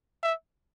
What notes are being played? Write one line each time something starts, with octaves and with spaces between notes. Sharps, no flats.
E5